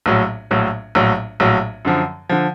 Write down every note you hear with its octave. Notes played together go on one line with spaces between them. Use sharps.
A#1 A2 F#3
A#1 A2 F#3
A#1 A2 F#3
A#1 A2 F#3
F#2 D3 F3
D3 F3